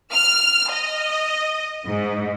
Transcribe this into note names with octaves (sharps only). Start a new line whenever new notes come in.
F6
D#5
G#2